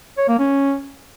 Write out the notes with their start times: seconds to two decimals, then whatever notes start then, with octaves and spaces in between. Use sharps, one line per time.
0.18 C#5
0.28 A#3
0.39 C#4